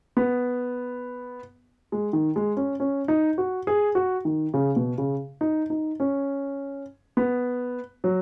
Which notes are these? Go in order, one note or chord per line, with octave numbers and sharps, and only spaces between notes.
B3
G#3
D#3
G#3
C#4
C#4
D#4
F#4
G#4
F#4
D#3
C#3
B2
C#3
D#4
D#4
C#4
B3
F#3